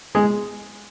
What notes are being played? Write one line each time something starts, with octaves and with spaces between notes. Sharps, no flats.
G#3 G#4